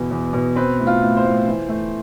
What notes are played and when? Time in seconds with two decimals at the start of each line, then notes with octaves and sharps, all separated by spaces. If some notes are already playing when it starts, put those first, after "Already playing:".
Already playing: E2 B2 B3
0.11 E2
0.33 B2
0.55 C4 B4
0.79 A2
0.87 F4
1.02 A2
1.17 C5
1.24 A2
1.47 E3
1.69 A3